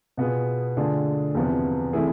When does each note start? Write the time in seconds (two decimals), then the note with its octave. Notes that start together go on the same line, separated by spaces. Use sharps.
0.17 B2 B3 F4 G#4
0.77 D3 A3 D4 F4 G#4
1.35 E2 C3 F3 B3
1.93 C3 E3 A3 E4 G#4